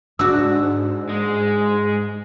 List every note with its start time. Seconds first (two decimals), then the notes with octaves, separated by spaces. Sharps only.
0.19 G#2 D4 F#4 E6
1.09 G#3